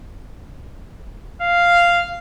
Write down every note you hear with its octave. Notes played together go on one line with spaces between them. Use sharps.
F5